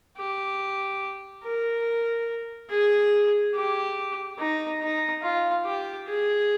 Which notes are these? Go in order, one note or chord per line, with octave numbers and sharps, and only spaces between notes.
G4
A#4
G#4
G4
D#4
D#4
F4
G4
G#4